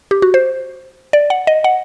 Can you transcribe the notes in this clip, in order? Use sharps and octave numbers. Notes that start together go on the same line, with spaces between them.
G4
F#4
C5
D5
F#5
D#5
F#5